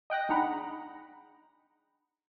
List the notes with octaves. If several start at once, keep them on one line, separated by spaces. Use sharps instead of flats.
D#5 G5 F#6 A#6
D4 D#4 G#4 F#5 A#5 B5